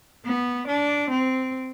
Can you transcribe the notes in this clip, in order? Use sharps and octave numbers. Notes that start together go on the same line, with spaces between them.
B3
D4
C4